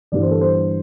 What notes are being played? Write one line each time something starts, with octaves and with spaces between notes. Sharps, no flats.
G1 G2 E3 D5
C5
A4
C5